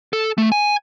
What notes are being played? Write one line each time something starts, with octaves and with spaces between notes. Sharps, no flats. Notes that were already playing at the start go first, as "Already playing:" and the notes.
A4
A3
G#5